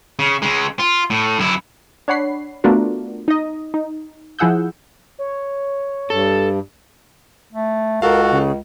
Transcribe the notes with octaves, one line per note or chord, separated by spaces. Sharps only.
C#3
C#3 G#3
F4
A2
F#2 E4
D4 C#5 F#5 B5 C7
A3 B3 D4 F4 F#4 A#4
D#4 D#5
D#4
F3 E4 G#4 F#5 E6 G6
C#5
G2 A4
A3
C#2 F#4 A4 A#4 F5
C#3